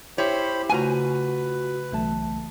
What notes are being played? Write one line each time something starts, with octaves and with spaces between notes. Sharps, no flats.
E4 G4 C5 C#5 B5
C#3 A3 F4 F#4 B4 G#5 A#5
B1 E3 A3 A5